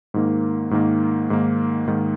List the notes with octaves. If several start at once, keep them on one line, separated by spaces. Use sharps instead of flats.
G#2 D#3 A#3
G#2 D#3 A#3
G#2 D#3 A#3
G#2 D#3 A#3